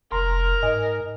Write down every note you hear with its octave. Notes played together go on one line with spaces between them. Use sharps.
F1 A#4 A#5 C6
G#2 D#5 G#5